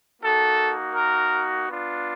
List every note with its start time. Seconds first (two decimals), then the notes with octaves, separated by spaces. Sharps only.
0.22 A#3 D#4 F#4 A4
0.95 A#4
1.68 B3 D4 F4